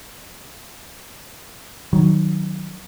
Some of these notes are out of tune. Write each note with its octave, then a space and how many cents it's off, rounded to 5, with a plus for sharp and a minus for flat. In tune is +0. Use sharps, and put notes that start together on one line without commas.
D#3 +0 F#3 +0